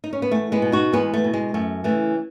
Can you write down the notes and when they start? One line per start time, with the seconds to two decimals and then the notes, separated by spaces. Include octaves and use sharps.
0.04 D#4
0.13 C#4
0.22 B3
0.31 E2 A3
0.52 G#3 B3
0.62 B2
0.72 D#4 F#4
0.93 E2 G#3 B3
1.14 A3
1.24 B2
1.33 G#3
1.54 F#2 A3
1.84 C#3 E3 A3